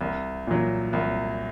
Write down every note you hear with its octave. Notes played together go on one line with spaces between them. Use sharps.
C2
A#2 F#3
C2